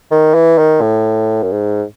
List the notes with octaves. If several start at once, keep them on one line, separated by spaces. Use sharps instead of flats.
D#3
E3
D#3
A2
F#2
G#2